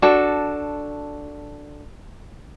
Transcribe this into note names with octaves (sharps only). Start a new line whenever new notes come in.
D4 F#4 A4